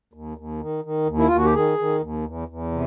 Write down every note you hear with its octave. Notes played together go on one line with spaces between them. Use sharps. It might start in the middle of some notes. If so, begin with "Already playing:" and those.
D#2
D#2
D#3
D#3
D#2
E4
D#2 F4
F#4
G4
D#3 G#4
D#3
D#2
E2
E2
C3